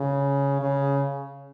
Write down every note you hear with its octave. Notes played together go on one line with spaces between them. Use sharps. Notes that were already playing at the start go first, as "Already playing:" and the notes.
Already playing: C#3
C#3